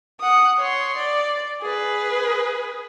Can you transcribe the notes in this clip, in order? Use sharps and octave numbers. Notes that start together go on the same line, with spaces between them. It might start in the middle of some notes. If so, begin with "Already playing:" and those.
F#5 D#6
C#5 C6
D5
G#4 B4